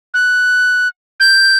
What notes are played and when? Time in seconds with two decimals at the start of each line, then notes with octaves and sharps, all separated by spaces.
0.14 F#6
1.20 G6